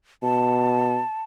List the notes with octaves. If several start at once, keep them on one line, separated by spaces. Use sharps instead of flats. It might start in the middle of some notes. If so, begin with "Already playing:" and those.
B2 A5